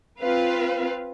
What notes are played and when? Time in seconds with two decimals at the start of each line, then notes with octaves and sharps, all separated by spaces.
0.21 C4 F4 B4 F5